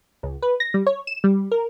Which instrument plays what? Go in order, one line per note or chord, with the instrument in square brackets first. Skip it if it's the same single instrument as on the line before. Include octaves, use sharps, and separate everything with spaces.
[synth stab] C#2
B4
A#6
G3
C#5
E7
G3
A#4